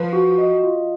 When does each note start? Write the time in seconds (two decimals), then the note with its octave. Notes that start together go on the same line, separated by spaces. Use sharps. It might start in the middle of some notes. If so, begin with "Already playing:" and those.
Already playing: F3 B4
0.13 F#4
0.38 D#5
0.64 F4